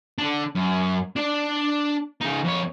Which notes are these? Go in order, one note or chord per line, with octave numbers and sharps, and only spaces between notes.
D3 D4
F#2
D4 D5
C#3 D#4
F2 C#5